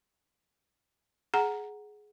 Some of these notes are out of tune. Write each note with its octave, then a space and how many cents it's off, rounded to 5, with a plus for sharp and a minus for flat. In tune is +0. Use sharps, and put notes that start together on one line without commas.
G#4 +15 F#5 +0 A#5 +0